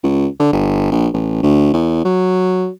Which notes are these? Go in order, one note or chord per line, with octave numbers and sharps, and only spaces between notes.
C#2
D3
G1
A#1
A1
D2
E2
F#3